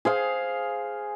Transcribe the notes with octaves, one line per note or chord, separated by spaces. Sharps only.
G#4 C5 F5